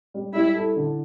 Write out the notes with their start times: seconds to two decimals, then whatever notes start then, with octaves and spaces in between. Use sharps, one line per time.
0.14 G3
0.34 G3 E4
0.56 A4
0.76 D3